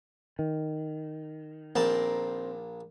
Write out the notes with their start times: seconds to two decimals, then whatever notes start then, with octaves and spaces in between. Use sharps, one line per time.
0.39 D#3
1.76 A#1 A#2 C4 A#4 A5